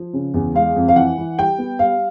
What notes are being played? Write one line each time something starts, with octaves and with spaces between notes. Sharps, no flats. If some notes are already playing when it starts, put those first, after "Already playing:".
Already playing: F3
C#3
E2
G#3 F5
F2
F5
E3 F#5
E3
G3 G5
B3
G3 F5